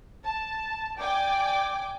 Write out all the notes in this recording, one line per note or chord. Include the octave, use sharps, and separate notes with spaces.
A5
D5 G5 G#5 D6